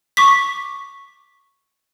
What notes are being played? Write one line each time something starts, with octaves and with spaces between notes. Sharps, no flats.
C#6 D6 B6